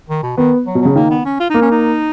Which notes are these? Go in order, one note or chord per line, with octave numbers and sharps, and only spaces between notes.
D#3
B2
D#3 B3
F#3
B2
C#3 F#3
D#3 A#3
B3
C#4
F4
A#3 D#4
C#4
D#4